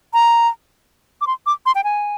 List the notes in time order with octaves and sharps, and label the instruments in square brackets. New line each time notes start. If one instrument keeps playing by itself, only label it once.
[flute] A#5
D6
C6
D6
C6
G5
G#5